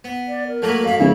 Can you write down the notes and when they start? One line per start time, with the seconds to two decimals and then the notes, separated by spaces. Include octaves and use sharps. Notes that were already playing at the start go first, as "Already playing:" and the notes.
0.04 B3
0.28 D5
0.48 A#4
0.62 F#3 A3 A#3 B4
0.84 F#2 F5 B5
0.99 D1 C#3 E4